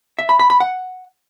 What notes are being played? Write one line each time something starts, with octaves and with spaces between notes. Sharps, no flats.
E5
B5
B5
B5
F#5